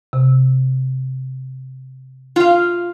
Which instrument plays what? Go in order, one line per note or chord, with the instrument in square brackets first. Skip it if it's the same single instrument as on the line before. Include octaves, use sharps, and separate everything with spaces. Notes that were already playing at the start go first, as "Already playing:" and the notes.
[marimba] C3
[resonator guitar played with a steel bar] F4 F5